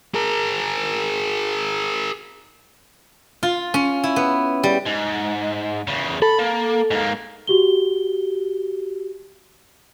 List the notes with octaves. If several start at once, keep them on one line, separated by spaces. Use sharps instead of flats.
G#4 A#4
F4
C#4
E4
B3
G3
G#2
E2 C#3
A4 B5
A#3
G#2 A#3
F#4 G4 G7